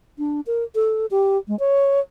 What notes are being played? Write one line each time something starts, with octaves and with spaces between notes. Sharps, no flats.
D4
A#4
A4
G4
G#3
C#5